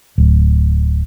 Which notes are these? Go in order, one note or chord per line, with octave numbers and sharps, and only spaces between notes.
D1